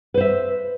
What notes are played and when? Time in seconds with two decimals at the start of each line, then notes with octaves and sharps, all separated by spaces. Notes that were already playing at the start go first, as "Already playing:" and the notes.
0.14 B4
0.17 C5
0.21 E5